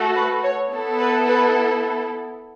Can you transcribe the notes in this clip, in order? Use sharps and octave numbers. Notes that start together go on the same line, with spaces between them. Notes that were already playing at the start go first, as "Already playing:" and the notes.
Already playing: A3 F#4 A4
B4
C#5
B3 E4 A4
B4
B4